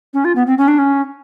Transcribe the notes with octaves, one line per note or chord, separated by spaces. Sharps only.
C#4
F4
B3
C4
C#4
D4
C#4